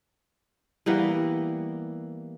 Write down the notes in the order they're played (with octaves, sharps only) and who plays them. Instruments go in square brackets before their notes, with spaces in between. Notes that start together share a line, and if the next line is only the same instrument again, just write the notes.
[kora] E3 G3 A#3 B3